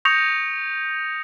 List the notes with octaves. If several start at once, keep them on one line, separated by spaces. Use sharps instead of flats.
C#6 D#6 G6 A#6 C#7 F7